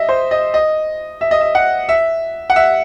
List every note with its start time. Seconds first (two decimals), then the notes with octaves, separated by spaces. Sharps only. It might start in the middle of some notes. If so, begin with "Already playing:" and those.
Already playing: D#5 E5
0.09 C5
0.31 D#5
0.54 D#5
1.21 E5
1.31 D#5
1.41 E5
1.55 F#5
1.89 E5
2.50 F#5
2.56 E5